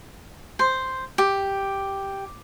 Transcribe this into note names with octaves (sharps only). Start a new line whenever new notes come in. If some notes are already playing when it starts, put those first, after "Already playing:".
C5
G4